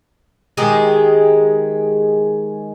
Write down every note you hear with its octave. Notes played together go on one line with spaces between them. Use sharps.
D#3 G#3 G4 G#4